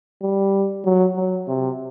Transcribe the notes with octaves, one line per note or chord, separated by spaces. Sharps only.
G3
F#3
F#3
C3